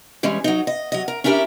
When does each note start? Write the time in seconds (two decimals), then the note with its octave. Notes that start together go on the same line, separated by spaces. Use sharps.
0.23 E3 G3 G#3 C#4
0.44 F#3 D#4
0.67 D#5
0.92 F#3 D#5
1.08 A#4
1.24 C#4 D4 E4 G4 A#4